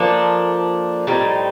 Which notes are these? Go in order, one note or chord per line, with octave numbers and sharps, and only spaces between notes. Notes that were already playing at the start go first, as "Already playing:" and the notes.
Already playing: F3 A#3 D4 A4
A2 G3 C4 D#4